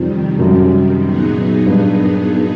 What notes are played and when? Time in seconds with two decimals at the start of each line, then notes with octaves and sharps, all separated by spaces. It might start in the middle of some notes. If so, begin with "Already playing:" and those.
Already playing: F2 C3 D#3 G3
0.39 F#2
1.02 A#2 F#3 B3 D#4 G#4
1.66 G2